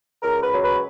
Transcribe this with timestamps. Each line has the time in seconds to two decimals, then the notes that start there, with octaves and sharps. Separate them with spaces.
0.23 C#2 A#4
0.42 B4
0.53 F#3
0.63 B4